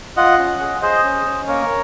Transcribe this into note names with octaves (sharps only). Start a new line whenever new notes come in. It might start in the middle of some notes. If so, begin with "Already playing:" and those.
F4 D#5 F#5
C#4
G#4
G#4 C5 D#5
C#4
C#4
A#3 A#4 C#5